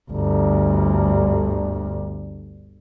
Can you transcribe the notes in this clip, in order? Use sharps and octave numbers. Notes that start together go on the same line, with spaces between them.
G1 D2